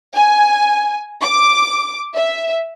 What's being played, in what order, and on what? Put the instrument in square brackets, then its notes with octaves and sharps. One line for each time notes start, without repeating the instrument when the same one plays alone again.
[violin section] G#5
D6
E5